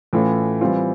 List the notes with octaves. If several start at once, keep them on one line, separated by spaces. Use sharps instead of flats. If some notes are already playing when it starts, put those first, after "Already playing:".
A2 E3 A3 C#4 F4
E3 G3 C4 F4